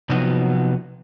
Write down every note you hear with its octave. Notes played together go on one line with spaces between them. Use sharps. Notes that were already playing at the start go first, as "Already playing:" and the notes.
C3 F3 F#3 B3 D#4 F#4